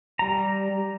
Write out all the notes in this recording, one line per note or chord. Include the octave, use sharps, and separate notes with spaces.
G3 A#5